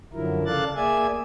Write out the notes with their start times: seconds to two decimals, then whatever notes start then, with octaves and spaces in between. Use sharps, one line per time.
0.13 F#2 D3 F3 F#3 E4 A#4
0.46 C#3 A4 D5 F5 F#6 A6
0.76 A#3 G#4 D5 E5 G#5 G#6